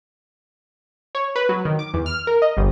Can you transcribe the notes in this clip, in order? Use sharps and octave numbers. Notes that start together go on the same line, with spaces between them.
C#5
B4
F#3
D#3
D6
E2
F6
A#4
D#5
G1